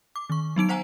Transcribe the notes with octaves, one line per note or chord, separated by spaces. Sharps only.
D6
D#3 C#6
F#3 B3 D#4 D7
B3 C5 F#5 G#5 A#5